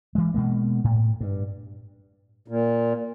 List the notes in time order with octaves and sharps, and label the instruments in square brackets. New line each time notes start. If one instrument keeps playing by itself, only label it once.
[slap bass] E3 G#3
B2 G#3 A#3
A2
G2
[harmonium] A#2